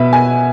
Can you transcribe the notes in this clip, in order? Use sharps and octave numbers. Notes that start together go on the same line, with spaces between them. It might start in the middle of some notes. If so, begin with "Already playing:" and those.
Already playing: B2 B4 E5
G#5